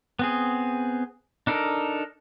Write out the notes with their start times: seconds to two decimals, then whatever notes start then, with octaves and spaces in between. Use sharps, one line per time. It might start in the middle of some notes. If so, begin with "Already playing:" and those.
0.19 B3 C4 G#4
1.47 D4 D#4 A4 A#4